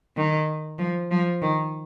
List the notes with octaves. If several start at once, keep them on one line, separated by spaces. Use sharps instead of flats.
D#3
F3
F3
D#3